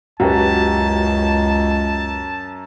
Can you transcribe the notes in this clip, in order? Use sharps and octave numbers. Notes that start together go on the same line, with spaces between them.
C#2 F#2 F#4 G4 B4 A5